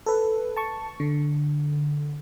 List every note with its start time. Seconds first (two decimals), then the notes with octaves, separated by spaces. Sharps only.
0.06 A4 B4
0.57 A5 C#6
1.00 D3